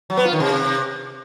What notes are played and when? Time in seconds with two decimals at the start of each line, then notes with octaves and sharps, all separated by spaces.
0.10 F#3
0.17 B3
0.25 F4
0.33 D#3
0.40 C3